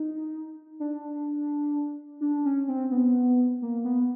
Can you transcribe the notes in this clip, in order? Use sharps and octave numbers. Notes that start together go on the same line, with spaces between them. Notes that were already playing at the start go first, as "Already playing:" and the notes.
Already playing: D#4
D4
D4
C#4
C4
B3
A#3
B3